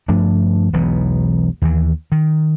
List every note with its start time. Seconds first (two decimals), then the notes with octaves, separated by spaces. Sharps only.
0.08 G2 F3 A3 D4
0.73 E1 B1 B2 E3
1.62 D#2 E3
2.12 D#3